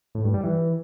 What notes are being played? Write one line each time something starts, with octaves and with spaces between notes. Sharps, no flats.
A2
G2
G3
E3